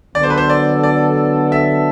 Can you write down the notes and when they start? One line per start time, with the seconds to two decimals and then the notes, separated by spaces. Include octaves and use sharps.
0.15 D3 F#3 B3 D4 A4 D5
0.23 C5
0.30 B4
0.38 C5
0.50 D5
0.83 D5
1.52 E5